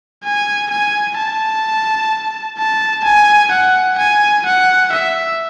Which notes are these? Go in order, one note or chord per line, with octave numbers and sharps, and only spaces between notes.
G#5
G#5
A5
A5
G#5
F#5
G#5
F#5
E5